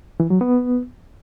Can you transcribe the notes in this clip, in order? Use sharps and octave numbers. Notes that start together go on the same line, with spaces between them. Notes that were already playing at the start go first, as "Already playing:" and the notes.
E3
F#3
B3